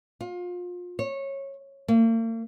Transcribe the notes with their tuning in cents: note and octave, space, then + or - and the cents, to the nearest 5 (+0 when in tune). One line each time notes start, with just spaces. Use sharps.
F4 +30
C#5 -20
A#3 -45